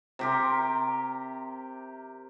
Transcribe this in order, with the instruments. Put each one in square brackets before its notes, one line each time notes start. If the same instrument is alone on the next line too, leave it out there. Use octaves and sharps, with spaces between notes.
[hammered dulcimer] C3 G4 A#4